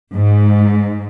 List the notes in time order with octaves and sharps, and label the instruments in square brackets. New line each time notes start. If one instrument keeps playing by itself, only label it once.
[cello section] G#2